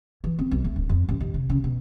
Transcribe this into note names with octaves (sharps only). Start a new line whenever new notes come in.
E3
C4
B1
A3
D1
F2
A1
D#2
C3
C#3
B2